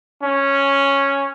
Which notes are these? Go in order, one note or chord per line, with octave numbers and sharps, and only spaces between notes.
C#4